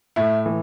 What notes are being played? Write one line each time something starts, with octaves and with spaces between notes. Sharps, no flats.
A2 E4
E3